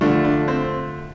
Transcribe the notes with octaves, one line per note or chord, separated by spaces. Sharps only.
D3 F3 A3 D4
D4
C4